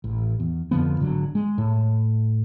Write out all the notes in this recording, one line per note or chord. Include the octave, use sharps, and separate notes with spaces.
A1
E2
F2 D3 F3 B3
G#1 D3 F#3
G#3
A2